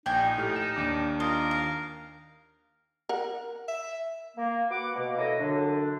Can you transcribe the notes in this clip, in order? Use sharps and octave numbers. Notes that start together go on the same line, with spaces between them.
A#1 D#4 G5 G#5
A2 G4 F6
E7
D#2 D4 D6
F4 A#4 D#5
F5
A#4 F#5
E5
A#3
F#4 B4 F#5 D6
B2 A#3
A#3 E4 A4 C#5 D#5
F#2 D3 D4